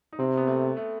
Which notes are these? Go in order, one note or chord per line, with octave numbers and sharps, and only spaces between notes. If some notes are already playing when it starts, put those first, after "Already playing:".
D#4
C3 C4
B3
A3
A3